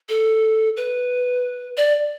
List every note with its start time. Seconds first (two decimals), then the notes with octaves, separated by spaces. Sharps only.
0.09 A4
0.77 B4
1.77 D5